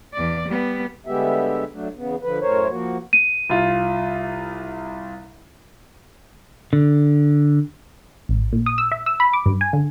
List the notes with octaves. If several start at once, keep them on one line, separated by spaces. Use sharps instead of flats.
E2 D5
G3 B3
D3 G3 G#3 B3 G4 E5
F#3 A3 D4
E2 C#3 B3
D3 F3 B4
F#2 A2 A#4 C5 C#5
F3 A#3 F#4
D#7
C2 F4
D3
A1
A#2
D#6
E6
E5
E6
B5
D6
G2
G#5
D3